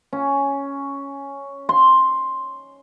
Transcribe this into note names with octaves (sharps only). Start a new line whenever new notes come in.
C#4
C6